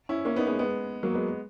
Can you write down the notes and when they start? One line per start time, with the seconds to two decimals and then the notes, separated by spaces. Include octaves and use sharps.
0.09 C#4 E4
0.25 A#3 C#4
0.36 B3 D#4
0.47 G#3 B3
0.59 G#3 B3
1.03 F#3 A#3
1.15 G#3 B3